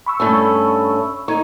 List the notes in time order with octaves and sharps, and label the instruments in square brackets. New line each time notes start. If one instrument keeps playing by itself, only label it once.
[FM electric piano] B5 C#6 E6
[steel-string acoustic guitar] G2 A3 C#4
[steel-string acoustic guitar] D#4 [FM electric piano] C#6 G#6